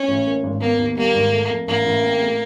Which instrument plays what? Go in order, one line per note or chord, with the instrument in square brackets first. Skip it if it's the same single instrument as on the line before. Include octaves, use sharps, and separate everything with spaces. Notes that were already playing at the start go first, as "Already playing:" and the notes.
Already playing: [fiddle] C#4
[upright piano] A1
A#3
G#1
[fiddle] A#3 [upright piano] B3
[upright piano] D#2
[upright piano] G3 [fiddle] A#3
[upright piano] G#1
A3
F2
[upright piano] A1 [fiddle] A#3
[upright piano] A1
C4
A2